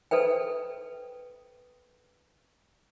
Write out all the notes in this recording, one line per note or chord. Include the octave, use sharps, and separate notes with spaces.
A4 B4 C5 G5